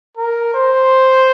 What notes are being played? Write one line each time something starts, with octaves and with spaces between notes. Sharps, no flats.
A#4
C5